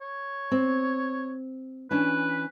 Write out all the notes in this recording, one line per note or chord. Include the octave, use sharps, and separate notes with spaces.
C#5
C4
E3 C#4 D4 B4